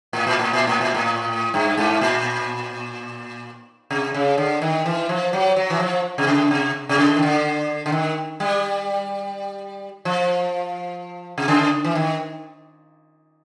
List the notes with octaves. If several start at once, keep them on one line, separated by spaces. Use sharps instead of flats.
A2
A#2
A2
A#2
A2
A#2
A2
G2
G#2
A#2
C3
C#3
D3
D#3
E3
F3
F#3
F#3
E3
F3
C3
C#3
C3
C3
C#3
D#3
D3
D3
D#3
G3
F3
C3
C#3
E3
D#3